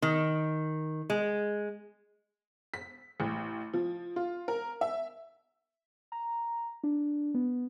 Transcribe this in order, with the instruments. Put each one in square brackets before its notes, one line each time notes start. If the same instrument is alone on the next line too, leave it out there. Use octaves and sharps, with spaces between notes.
[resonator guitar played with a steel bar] D#3
G#3
[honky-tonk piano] B6
A1
F3
F4
A#4
E5
[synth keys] A#5
D4
B3